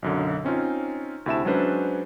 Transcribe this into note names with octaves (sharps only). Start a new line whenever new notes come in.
B1 F#2 D3
C4 C#4 D#4 F4
D2 C3 E4 E5 A5 E7
F#3 G#3 C#4 D4 B4 C5